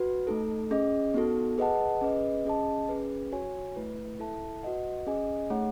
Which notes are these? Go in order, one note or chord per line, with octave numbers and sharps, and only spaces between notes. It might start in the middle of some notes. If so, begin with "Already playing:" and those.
Already playing: F#4 B4
A3 D#4 A4
C#4 G#4 D#5
B3 D#4 F#4 A4
G#4 B4 D#5 F#5 A5
C#4 G#4 B4 D#5
C#4 G#4 D#5 A5
C#4 G#4 B4
F#4 C#5 G#5
A3 E4 B4
E4 A4 E5 A5
F#4 B4 D#5 F#5
C#4 G#4 D#5 G#5
A3 D#4 G#4 C#5 F#5